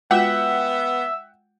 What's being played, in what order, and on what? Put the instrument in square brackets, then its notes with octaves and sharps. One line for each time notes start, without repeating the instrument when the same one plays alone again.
[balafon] G#3 F4 F#4 [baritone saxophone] B3 [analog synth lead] E5 [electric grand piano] F#5 G5